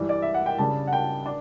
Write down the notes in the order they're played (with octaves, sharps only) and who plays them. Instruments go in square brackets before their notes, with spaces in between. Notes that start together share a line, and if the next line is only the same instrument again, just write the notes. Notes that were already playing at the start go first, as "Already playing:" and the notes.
Already playing: [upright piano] G2 E3 G3
D5
E5
F#5
G5
C#3 G3 D4 A5
F#5
G5
D4